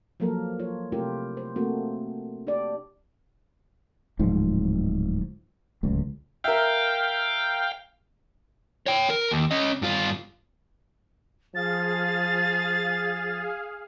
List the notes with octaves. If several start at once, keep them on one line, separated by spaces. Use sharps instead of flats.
F3 F#3 A#3 A4 A#4
F4 C#5
C3 A3 E4 F4 G4 A#4
C5
A3 A#3 C4 F#4
D4 G4 D5
D1 G#2 F3
D1 C#2
A#4 E5 F5 G5
C#5 G5
A#4
D#2
C#4 D#5
G2 F4
F3 G#4 F5 A6